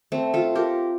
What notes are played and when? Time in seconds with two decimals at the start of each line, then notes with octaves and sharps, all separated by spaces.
0.12 A3 C4
0.34 F4 A4
0.55 G4 A#4